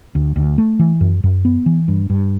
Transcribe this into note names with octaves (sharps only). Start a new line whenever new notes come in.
D2
D2
A3
E3
F#2
F#2
B3
E3
G2
G2